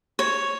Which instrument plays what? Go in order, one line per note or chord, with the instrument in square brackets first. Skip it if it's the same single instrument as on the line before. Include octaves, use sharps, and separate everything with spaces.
[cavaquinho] C#5